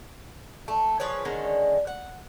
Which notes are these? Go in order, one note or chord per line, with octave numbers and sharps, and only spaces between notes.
A3
F3 G#4 B4 C#5
D3 D#3 G#3 C#4
F#5